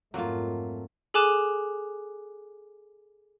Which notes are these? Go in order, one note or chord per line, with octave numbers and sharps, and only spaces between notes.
F2 G#2 F#3 A3 A#3 F4
G#4 A4 G#5 D6 F#6 E7